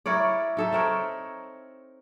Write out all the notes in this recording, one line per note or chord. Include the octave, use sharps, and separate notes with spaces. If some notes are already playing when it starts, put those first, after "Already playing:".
E4 A#4 C#5 D5
D#4 A4 E5
C4 A#4 C#5